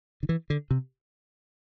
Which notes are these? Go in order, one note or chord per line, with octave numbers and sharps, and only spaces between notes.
D3
E3
D3
C3